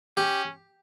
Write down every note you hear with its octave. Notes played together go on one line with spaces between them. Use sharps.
C#4 G4